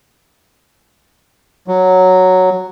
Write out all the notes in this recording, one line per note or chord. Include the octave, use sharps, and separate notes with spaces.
F#3